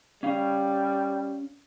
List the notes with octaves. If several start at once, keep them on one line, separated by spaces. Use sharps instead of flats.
G3 C#4 F5